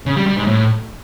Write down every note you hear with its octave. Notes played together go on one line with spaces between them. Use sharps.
C#3
G3
G3
G#2
A2